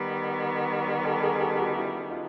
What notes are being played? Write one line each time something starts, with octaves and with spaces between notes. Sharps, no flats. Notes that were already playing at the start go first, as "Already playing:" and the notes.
Already playing: D#3 G3 B3
G4 A4
G#4 A#4
A#4
G4 A4
F#4 G#4
E4 F#4
D#4 F4